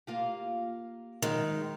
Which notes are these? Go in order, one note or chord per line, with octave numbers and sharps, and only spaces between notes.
A#3 F4 G4
D#3 F#3 G#3